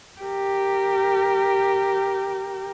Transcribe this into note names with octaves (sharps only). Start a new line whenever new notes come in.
G4 A#4